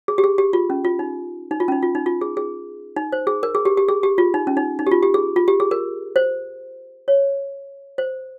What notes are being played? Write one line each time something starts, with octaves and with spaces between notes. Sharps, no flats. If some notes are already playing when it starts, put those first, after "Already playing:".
G#4
G4
G#4
G4
F4
C#4
F4
D#4
D#4
F4
C#4
D#4
F4
D#4
F4
G#4
G#4
D#4
C5
G#4
A#4
G#4
G4
G4
G#4
G4
F4
D#4
C#4
D#4
D#4
G4
F4
G4
G#4
F4
G4
G#4
A#4
C5
C#5
C5